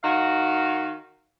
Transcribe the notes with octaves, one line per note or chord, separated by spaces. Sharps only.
D#3 F#4 F5